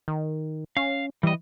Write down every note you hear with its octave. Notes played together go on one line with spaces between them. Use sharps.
D#3
C#4 F5
E3 G3 D#5